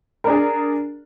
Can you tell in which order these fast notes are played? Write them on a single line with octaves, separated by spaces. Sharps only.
A#4 D4 G#4